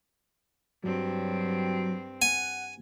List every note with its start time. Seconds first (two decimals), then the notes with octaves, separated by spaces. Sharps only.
0.84 G2 F#3 C4
2.22 F#5 G#5